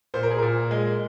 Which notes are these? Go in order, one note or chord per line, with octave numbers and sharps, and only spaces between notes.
A#2 C5
A#4
G#4
A#2 A#4
G#3